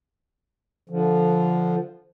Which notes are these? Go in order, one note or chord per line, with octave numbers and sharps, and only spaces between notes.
D3 F3